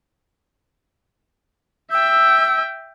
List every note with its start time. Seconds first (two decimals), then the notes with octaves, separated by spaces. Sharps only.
1.92 E5 G5 E6